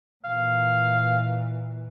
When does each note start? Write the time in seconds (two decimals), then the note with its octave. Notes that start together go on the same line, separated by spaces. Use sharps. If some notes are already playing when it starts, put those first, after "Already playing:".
0.25 A#2 E3 F5